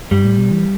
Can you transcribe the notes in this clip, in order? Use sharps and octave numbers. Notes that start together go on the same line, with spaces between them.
G2 G3
A2
B2
E3